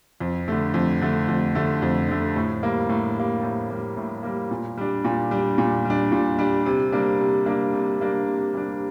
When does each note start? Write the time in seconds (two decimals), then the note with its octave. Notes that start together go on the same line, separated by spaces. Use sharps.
0.20 F2
0.48 D3 A3
0.74 F2
1.02 D3 A3
1.28 F2
1.55 D3 A3
1.82 F2
2.08 D3 A3
2.36 A2
2.63 G3 A#3
2.89 A2
3.16 G3 A#3
3.43 A2
3.70 G3 A#3
3.97 A2
4.23 G3 A#3
4.51 A#2
4.78 G3 D4
5.05 A#2
5.31 G3 D4
5.58 A#2
5.85 G3 D4
6.12 A#2
6.38 G3 D4
6.66 C3
6.92 G3 A#3 D4
7.20 C3
7.46 G3 A#3 D4
7.74 C3
8.00 G3 A#3 D4
8.27 C3
8.53 G3 A#3 D4